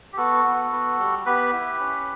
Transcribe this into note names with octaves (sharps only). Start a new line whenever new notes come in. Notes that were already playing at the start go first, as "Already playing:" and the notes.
G4
B3 F#4 A4
B3
B3
G3
B3 G4 B4
E4
C#4